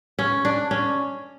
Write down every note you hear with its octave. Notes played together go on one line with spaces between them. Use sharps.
C#4
D4
C#4